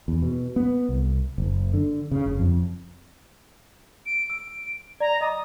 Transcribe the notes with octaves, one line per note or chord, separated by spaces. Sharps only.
E2
B2
B3
C2
F#1
D3
C#3
F#1
F2
D7
E6 D7
D5 A#5
D#5 A#5 D6 D#6